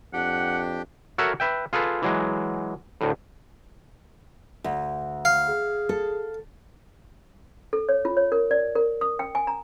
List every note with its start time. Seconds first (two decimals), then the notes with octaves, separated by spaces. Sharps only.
0.13 F2 D4 G4 F#5 G5
1.18 F#4 A4 A#4 C#5 E5 F#5
1.40 B4 E5 G5
1.73 F4 G#4 A4 B4
2.02 E3 F#3 G#3
3.01 D2 A2
4.64 D2
5.25 F5
5.48 G#4
5.89 A4
7.73 A4
7.89 C#5
8.05 F4
8.17 C#5
8.32 A#4
8.51 D5
8.75 A#4
9.01 D#6
9.19 G5
9.35 G#5
9.47 A#5